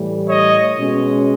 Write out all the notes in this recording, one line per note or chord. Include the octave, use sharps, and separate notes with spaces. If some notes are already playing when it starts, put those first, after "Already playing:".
Already playing: A2 E3 G3
C#5 D#5
B2 G#3 C#4